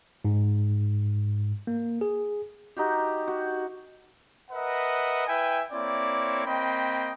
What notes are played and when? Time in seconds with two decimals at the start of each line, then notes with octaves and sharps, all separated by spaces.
0.25 G#2
1.67 A#3
2.01 G#4
2.77 D#4 F#4 G4
3.28 F#4
4.51 A#4 B4 D#5 E5 F#5
5.27 E4 B4 E5 G5 G#5
5.72 A#3 C4 E4 C#5 D5
6.46 A#3 C4 D#5 G5 B5